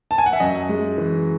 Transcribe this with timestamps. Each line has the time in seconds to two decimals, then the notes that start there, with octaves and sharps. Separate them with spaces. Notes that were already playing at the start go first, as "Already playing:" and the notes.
0.11 A5
0.18 G#5
0.26 F#5
0.33 E5
0.40 F#2 D#5
0.69 G#3
0.98 E3